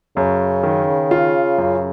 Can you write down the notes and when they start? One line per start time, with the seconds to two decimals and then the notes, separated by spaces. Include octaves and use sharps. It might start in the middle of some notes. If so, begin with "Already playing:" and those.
0.17 F#2 C#3
0.63 D#3
1.11 F4
1.58 F#2